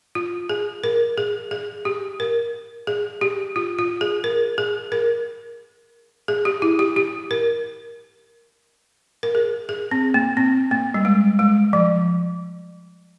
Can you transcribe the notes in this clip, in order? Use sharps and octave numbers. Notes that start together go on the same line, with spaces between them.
F4
G#4
A#4
G#4
G#4
G4
A#4
G#4
G4
F4
F4
G#4
A#4
G#4
A#4
G#4
G4
E4
G4
G4
A#4
A#4
G#4
G#4
C4
A#3
C4
A#3
G3
G#3
G#3
F3